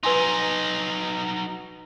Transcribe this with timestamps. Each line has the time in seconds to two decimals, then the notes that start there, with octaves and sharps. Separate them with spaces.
0.03 F#3 D#4 B4 G#5 C6